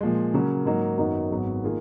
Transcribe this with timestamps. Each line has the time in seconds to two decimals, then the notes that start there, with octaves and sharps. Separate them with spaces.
0.01 A#2 F3 G#3
0.34 C#3 F#3 A#3 C#4
0.65 G#2 F#3 A#3 D#4
0.98 F#2 D#3 F#3 B3 D#4
1.30 G#1 G#2 F#3 B3
1.64 D#3 A#3 F4 G#4